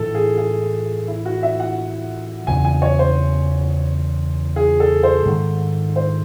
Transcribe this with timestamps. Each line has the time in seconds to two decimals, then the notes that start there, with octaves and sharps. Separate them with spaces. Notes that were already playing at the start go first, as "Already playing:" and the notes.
Already playing: A2 E3 A3 A4
0.15 G#4
0.38 G#4
1.08 E4
1.25 F#4
1.43 E5
1.60 F#5
2.47 E2 C#3 E3 G#5
2.65 G#5
2.82 C#5
2.99 C5
4.56 G#4
4.80 A4
5.03 C5
5.25 G#2 D#3 A3
5.96 C5